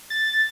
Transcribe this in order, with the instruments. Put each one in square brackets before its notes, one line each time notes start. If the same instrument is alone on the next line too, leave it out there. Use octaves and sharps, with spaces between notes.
[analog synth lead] A6